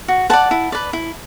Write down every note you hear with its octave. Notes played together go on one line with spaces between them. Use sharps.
F#4
B4 D5 F#5 A5
E4
B4 D5
E4